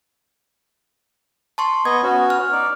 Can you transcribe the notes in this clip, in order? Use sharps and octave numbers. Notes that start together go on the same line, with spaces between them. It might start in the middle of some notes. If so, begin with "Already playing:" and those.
A5 C6 C#6
B3 D#5 G#6
B3 C#4 F#4
F6
D#4 D5